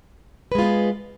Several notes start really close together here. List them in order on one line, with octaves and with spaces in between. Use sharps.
B4 G#3 F4 B3